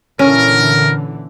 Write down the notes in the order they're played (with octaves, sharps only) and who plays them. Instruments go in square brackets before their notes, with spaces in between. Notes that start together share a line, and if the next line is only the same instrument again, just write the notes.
[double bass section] A#2 D3 E3 [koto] C#4 [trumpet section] A#4